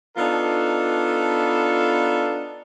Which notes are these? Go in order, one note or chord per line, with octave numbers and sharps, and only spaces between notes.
B3 D4 D#4 F4 A4